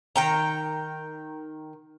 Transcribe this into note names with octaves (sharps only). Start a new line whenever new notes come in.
D#3 G5 A#5